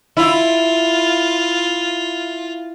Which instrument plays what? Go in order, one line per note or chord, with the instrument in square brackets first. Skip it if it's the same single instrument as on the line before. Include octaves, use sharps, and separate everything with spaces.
[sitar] E4 [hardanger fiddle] F4